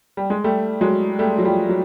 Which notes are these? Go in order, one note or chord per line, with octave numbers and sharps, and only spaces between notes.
G3
G#3
G3 A3
F#3 G#3
G3 A3
F#3
F3 G3
F#3